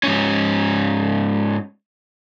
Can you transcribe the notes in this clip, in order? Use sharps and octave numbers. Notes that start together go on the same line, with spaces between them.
G#2 C#4